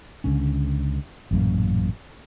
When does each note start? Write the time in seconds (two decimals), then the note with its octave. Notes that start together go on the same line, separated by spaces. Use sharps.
0.24 C#2 D3 C#4
1.31 A1 F#2 A#2